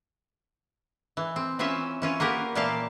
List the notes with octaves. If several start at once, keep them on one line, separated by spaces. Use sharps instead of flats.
E3
C4
E3 C4 C#4 F4 E5
E3 C#4 F4
A#3 B3 G4 A#4 B4
A#2 E3 A#3 G4 F5 A5